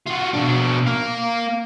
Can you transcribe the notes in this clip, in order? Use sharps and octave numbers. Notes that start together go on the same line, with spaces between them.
F4 F#4
B2 D4
A#3 F5